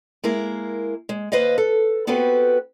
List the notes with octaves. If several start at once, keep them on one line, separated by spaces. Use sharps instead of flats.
G#3 A#3 E4 A#4
G#3
D#2 B4 C5 D#5 F5
A4
B3 C4 F#4 G4 A4 B4